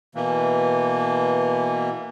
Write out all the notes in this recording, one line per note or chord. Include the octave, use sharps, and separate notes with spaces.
B2 E3 A#3